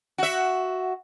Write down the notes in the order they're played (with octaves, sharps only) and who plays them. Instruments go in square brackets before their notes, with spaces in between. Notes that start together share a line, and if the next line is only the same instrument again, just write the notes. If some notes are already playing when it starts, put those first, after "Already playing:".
[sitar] F#4 E5